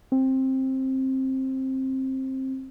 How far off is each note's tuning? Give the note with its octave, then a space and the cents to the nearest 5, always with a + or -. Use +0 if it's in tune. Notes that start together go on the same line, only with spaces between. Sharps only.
C4 +15